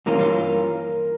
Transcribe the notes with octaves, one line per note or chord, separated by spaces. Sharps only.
G2 E3 A#3 C#4 F4 A#4